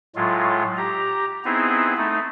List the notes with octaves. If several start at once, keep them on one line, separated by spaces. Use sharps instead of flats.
A2 F#3 G#3 F4
G4 A#5
B3 C4 D#4 E4 G#4
A3 D#4